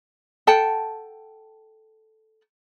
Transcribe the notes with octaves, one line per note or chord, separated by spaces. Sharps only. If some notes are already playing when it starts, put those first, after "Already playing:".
A4 F#5 G5 A5